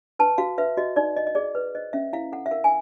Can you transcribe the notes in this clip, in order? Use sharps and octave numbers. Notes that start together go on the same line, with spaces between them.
B4 A5
F#4 F5
B4 E5
F#4 D#5
D#4 D5
D#4 D#5
D#5
G#4 D5
B4
C5 D#5
C#4 E5
E4 F5
A4 F#5
E5
A#4 F5
G#5